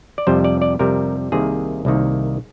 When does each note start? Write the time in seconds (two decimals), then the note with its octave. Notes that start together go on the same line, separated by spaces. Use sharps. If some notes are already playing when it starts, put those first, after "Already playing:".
0.18 D5
0.27 F2 C3 G3 C5
0.44 D5
0.61 D5
0.79 F2 C3 G3 A#4
1.32 C2 C3 D#3 A#3 G#4
1.85 C2 C3 D#3 A#3